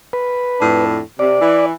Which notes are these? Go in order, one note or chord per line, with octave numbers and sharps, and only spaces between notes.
B4
F2 A2 D4
C3 D5
E3